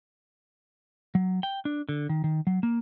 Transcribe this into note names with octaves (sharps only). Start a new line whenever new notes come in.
F#3
G5
D4
D3
D#3
D#3
F#3
A#3